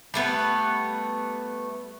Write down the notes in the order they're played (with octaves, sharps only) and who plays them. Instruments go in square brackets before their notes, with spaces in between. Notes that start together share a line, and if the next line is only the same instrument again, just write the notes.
[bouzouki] G3 A3 B3 B4